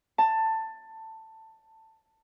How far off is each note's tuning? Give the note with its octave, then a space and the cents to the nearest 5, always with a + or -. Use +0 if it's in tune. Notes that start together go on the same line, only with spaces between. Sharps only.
A5 +15